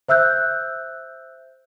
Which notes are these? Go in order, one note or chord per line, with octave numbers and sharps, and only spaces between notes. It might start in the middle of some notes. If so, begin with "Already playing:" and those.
C5 E5 E6 F#6 G6